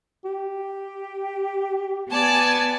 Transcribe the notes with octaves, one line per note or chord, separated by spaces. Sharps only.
G4
B3 D5 G#5 A5 A6